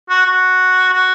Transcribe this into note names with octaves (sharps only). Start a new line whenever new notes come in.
F#4
F#4
F#4